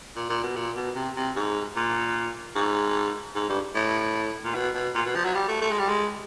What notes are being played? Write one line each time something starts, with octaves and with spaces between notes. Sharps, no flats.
A#2
A#2
B2
A#2
B2
C3
C3
G#2
A#2
G#2
G#2
G2
A2
A#2
B2
B2
A#2
B2
F3
F#3
G3
A3
A3
G#3
G3
G#3